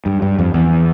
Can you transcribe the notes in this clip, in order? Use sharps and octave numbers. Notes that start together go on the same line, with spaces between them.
G2
G2
F2
E2